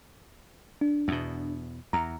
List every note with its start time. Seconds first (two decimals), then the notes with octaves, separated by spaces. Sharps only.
0.81 D4
1.08 E2 B2
1.93 E2 A#5